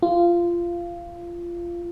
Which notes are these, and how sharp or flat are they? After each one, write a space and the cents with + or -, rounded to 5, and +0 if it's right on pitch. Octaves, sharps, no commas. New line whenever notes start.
F4 -15